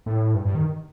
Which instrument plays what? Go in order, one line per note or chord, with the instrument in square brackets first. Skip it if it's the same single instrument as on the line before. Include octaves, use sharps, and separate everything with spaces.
[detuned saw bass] A2
G2
G2
D#3